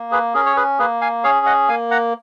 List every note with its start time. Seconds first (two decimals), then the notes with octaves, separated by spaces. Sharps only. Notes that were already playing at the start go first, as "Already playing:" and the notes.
Already playing: A#3
0.11 G#4 B4
0.34 C#4 G#4 A#4
0.46 C#5
0.56 G#4 B4
0.79 A#3 G#4 B4
1.01 F5 G#5
1.24 C#4 G#4 C#5 F5
1.46 D#5 F#5
1.69 A#3 F5 G#5
1.91 F#5 A#5